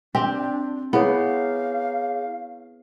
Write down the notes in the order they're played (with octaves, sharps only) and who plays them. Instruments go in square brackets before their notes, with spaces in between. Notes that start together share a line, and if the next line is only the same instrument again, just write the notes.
[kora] C4 G4 [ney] D4
[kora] B3 [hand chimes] E4 G#4 C#5 [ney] F5